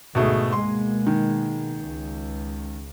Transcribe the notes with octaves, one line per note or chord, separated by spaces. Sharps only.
D2 G#2 B2 A3 G#4
B2 G#3 A#3 C6
D#3
C#2